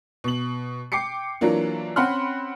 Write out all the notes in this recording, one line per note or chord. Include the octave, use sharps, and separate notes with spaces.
B2 F#7
G5 D6 C7 C#7
E3 F#3 A#3 D4 F4
C4 C#4 F#5 B5 C6 F6